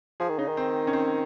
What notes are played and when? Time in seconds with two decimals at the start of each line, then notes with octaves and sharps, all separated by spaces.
0.20 F3 G#4
0.29 D#3
0.39 C#3 D#4
0.49 D#3
0.57 C4
0.87 C#4
0.93 C4